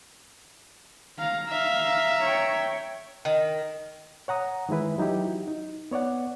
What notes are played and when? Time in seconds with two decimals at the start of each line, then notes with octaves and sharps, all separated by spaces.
1.18 F5 A#5
1.48 E5 F5 A#5
2.24 C#5 G5
3.25 D#3
4.28 C#5 F#5 A#5 D#6
4.69 D#3 E3 G#3 E4 B4
4.98 F#3 D#4 E4 G4
5.26 F#4
5.48 D#4
5.91 B3 C#5 D5 F#5